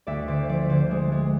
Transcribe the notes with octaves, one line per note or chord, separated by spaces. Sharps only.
D2 D5 E5
D3 C5 D5
F3 D5 E5
D3 C5 D5
G#3
G#3